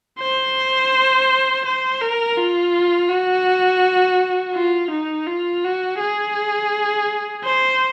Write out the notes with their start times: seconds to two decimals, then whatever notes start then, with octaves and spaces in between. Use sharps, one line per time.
0.20 C5
1.65 C5
2.01 A#4
2.37 F4
3.09 F#4
4.55 F4
4.91 D#4
5.27 F4
5.64 F#4
6.00 G#4
7.44 C5